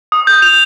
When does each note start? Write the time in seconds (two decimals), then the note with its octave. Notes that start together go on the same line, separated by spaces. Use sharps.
0.12 D#6
0.27 G6
0.42 F7